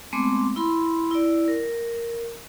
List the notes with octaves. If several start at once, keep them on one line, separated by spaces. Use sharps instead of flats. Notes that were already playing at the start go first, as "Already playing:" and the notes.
G#3 A3 B3 C4 C6 D6
E4 B5 C6
E4 D5
A#4